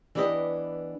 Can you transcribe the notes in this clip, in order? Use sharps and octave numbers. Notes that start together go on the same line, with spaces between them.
E3 B3 D4 G4 B4 D#5